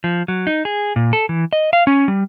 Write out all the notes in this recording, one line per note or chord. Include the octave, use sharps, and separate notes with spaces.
F3
F#3
D#4
G#4
A#2
A4
E3
D#5
F5
C#4
G3